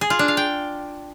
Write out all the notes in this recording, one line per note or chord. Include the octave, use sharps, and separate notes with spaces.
G#4
F4
D4
F5
G5